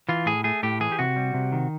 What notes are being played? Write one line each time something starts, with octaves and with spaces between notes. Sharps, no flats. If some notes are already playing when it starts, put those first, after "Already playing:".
E3 F4
A2 G#4
A3 G#4
A2 G4
E3 G#4
G4
C3 F#4
G3
C3
D#3